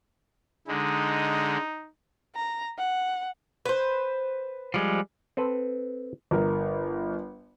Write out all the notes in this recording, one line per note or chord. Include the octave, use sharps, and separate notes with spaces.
D3 G#3 D#4
A#5
F#5
B4 C5
F3 G3 G#3
C4 A4 B4
G1 A#4